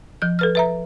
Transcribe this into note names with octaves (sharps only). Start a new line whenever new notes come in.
F3 G6
A4 B4 F6
B4 E5 A#5